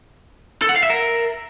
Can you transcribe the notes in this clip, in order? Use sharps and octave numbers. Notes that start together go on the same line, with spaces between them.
A4
F#5
F5
E5
A#4